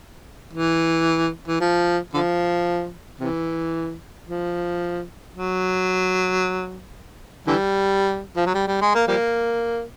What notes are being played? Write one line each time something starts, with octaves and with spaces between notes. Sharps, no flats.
E3
E3
F3
D3 F3
C3 E3
F3
F#3
D3 E3 G3
F3
F#3
G3
G3
G#3
A#3
F3 G3 A#3